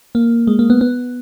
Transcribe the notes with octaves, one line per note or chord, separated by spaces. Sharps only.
A#3
G#3
A#3
B3
B3